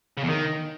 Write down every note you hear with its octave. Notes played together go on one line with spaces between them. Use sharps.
C#3
E2
D#3